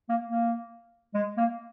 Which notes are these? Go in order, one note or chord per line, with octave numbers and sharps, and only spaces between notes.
A#3
A#3
G#3
A#3